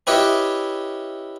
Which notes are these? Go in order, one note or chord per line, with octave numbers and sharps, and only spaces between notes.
C#4 E4 G4 B4 C#5 D#5